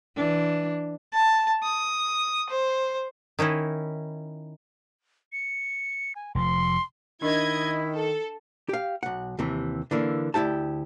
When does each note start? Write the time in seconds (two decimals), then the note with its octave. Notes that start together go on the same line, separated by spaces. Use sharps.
0.16 E3 D4
1.13 A5
1.63 D#6
2.50 C5
3.39 D#3 C#4 D#4 E4
5.32 C#7
6.16 G#5
6.35 F1 A2 F3 C6
7.22 D#3 D4 E4 A#4 D#5 G#6
7.95 A4
8.69 G4 F5
9.03 B1 F#5
9.39 D#2 C3 E3
9.91 D3 E3 A#3
10.34 D2 E3 E4 G4 A5